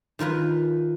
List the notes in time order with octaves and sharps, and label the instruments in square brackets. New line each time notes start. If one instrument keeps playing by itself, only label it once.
[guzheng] D#3 F4 A#4 B4